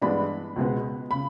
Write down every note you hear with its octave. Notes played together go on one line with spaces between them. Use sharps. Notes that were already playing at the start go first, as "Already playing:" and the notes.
G2 E3 G#3 B3 D4 B5
C#2 B2 G#3 B3
C#3 B5